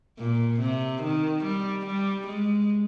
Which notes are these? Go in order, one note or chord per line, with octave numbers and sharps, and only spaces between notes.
A#2
C3
D#3
G3
G3
G#3